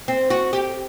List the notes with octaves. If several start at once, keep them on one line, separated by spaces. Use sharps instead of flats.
C4
F#4
G4